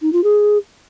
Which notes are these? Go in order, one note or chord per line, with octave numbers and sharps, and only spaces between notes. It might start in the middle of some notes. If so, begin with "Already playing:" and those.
D#4
F4
G#4